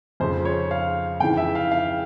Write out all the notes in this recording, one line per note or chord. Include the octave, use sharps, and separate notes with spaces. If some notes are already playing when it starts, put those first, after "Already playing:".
F2 C#3 F3 C5
C#5
F5
F2 C#3 E3 G5
E5
F5
F5